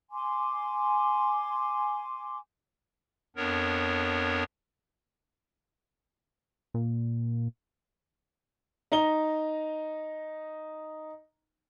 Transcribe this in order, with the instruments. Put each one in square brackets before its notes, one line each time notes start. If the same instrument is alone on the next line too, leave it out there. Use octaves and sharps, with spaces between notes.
[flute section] G#5 C6 D6
[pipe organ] F2 B3 D4 A#4 C#5
[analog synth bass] A#2
[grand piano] D#4 A#5 G7